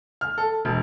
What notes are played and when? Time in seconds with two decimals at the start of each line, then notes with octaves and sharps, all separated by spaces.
0.21 F6
0.38 A4
0.65 E1